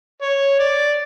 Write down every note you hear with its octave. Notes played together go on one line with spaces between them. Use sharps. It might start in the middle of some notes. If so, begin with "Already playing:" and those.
C#5
D5